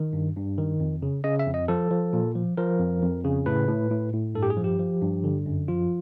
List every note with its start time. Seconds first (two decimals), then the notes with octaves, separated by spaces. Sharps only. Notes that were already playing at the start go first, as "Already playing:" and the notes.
Already playing: D#3
0.13 G2
0.36 G2
0.58 D#3
0.80 F2
1.02 C#3
1.24 C#3 D#5
1.39 E5
1.47 F2
1.54 D#5
1.68 F3 A4
1.91 F3
2.13 A#2
2.35 F3
2.57 F3 A#4
2.79 F2
3.02 F2
3.24 C#3
3.46 A2 B4
3.68 A2
3.90 A2
4.13 A2
4.35 G2 A4
4.43 G4
4.50 G#4
4.57 F3
4.64 G4
4.79 F3
5.02 G2
5.24 D3
5.46 F#2
5.68 F3 F4